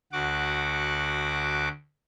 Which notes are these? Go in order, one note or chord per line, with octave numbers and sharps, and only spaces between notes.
D2 F#4 F#5 D6